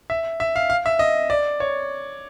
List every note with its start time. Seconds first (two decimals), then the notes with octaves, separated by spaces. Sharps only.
0.10 E5
0.40 E5
0.56 F5
0.70 F5
0.86 E5
0.99 D#5
1.30 D5
1.60 C#5